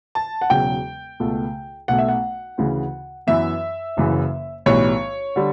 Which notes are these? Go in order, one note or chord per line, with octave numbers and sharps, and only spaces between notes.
A5
F#5
E1 E2 C#3 F#3 G5
C#2 B2 A3
B1 B2 A3 F#5
E5
F#5
D2 C#3 E3
F#2 E3 B3 E5
F#1 F#2 C#3 E3
B1 A2 E3 G3 C#5
D3 G3